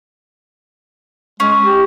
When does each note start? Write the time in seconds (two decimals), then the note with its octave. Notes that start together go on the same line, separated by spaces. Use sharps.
1.40 G#3 C#4
1.63 G4